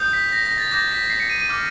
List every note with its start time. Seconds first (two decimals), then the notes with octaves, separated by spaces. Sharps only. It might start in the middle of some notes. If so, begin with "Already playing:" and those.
Already playing: D#6 G6
0.13 B6
0.32 A#6
0.45 A#6
0.58 A6
0.71 D6 G6 A#6
0.91 B6
1.10 C7
1.20 C#7
1.30 D#7
1.40 D#7
1.49 D6 F6